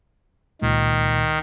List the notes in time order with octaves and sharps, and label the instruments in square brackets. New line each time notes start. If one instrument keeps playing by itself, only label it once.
[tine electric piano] C#2 A#2 G#3 [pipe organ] D#3